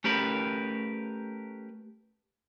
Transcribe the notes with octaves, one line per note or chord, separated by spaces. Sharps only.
A3 C#4 G4 A#4 B4